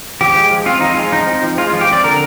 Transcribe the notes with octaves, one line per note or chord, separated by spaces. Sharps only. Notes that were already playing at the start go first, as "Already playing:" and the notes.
F3 G4
G#3
F3
C4 F4
F3 D#4
G#3 F4
F3 D#4
C4
F3
G#3 F4
F4
F3
G4
C4 D5
D3 A#4